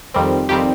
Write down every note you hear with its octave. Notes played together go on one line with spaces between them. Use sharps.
F2 D#3 G3 C4
F2 D#3 G3 C4 G4